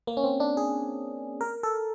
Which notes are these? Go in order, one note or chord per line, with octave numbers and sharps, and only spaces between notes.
A#3
C#4
C4
D4
G#4
A#4
A4